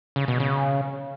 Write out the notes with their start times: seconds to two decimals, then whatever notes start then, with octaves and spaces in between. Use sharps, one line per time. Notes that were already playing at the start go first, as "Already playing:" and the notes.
0.16 C#3
0.28 B2
0.40 C#3